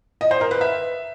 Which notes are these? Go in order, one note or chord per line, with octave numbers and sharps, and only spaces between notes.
D#5
C5
A#4
B4
E5